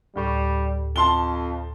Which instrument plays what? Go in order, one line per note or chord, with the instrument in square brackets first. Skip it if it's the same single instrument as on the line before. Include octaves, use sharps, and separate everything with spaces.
[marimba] D2 A2 [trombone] G3
[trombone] F2 [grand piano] A5 C6 G7